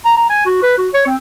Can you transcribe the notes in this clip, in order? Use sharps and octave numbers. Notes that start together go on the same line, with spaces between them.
A#5
A#5
G#5
F#4
B4
F#4
C#5
C4